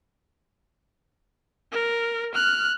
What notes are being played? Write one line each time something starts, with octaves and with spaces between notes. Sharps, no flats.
A#4
F6 F#6